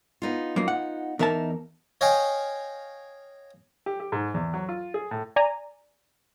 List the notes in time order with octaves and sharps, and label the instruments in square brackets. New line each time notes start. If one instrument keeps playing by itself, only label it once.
[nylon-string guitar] B3 D#4 F4
[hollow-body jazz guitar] F#2 A#3
F#5
[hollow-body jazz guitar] E2 A5 [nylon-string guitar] D#4 A#4 E5
[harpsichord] C#5 D#5 F5 G5 G#5 C#6
[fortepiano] G4
G4
G#2
E2
F#3
F4
G#4
A2
[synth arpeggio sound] D5 G#5 A#5